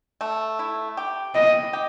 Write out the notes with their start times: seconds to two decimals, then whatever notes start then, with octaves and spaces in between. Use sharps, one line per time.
0.21 A3
0.59 E4
0.97 G4
1.35 E4 D#5
1.73 G4